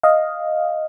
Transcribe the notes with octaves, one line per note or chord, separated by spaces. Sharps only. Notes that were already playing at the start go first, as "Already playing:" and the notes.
D#5 F5